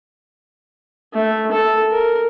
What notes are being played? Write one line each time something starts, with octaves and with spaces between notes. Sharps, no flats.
A3
A4
A#4